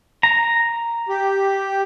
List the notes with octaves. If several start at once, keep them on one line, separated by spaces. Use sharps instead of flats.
A#5
G4